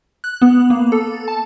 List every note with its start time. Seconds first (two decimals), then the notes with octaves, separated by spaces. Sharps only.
0.24 F#6
0.42 B3
0.70 A#3
0.92 A4
1.28 A5